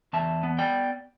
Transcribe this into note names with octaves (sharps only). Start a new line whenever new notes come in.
E2 E5 A5
B3
D5 G5